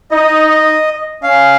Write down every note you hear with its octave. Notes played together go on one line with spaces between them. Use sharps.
D#4 D#5
C#4 F5